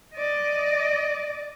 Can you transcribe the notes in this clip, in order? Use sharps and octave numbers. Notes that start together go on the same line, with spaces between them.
D5 D#5